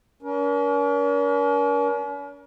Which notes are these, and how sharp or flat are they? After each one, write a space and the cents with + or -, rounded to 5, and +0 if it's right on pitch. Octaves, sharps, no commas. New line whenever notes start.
C#4 +45 A#4 +35